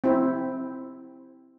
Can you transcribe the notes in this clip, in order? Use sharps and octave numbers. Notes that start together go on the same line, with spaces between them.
C4 E4